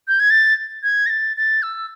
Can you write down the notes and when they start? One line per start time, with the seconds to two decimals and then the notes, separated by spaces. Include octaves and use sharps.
0.08 G6
0.20 G#6
0.30 A6
0.83 G#6
1.06 A#6
1.10 A6
1.37 A6
1.63 E6